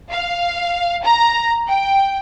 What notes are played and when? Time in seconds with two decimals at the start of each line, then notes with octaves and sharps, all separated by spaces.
0.13 F5
1.04 A#5
1.68 G5